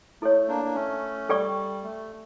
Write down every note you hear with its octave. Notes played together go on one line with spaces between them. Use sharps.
A3 E4 A4 C#5
A#3 D4
A#3
A3 C#4
G3 A4 D5 G5 C#6
A3